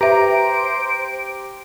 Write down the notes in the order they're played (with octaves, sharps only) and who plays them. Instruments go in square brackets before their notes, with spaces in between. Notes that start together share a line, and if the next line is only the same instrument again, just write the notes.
[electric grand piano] G4 A#5 [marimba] B4 E5 [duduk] C5 [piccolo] D7